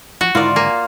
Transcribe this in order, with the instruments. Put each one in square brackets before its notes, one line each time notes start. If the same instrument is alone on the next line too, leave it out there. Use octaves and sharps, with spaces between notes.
[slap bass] F3 [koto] F#4
[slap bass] G#2 D3 D#3 [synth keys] E4 A#4 [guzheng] F4 D5
[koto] A#3 [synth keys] G#5